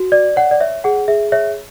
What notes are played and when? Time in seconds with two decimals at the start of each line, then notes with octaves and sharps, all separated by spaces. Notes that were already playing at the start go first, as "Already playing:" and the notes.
Already playing: F#4
0.12 D5
0.36 C#5 F#5
0.51 D5
0.60 C#5 E5
0.84 G#4 F#5
1.08 G#4 E5
1.32 C#5 E5